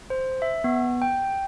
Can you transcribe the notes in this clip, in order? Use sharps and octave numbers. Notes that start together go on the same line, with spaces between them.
C5
E5
B3
G5